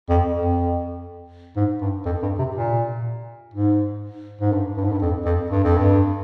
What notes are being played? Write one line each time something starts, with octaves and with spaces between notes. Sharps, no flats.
F2
F2
G#2
G2
F2
G2
C3
A#2
G#2
G#2
G2
G2
G#2
G2
F2
F2
G2
F2
G2